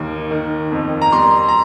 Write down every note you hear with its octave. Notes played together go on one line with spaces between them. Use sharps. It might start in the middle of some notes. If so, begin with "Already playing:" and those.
Already playing: D#2 A#3
D#3
F2
A#5
G3 C6
A#5